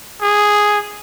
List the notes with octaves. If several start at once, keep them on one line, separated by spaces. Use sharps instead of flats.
G#4